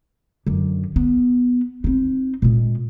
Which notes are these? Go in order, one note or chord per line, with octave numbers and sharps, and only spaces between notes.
F#2 D3
B3
C4 D#4
A#2 G#3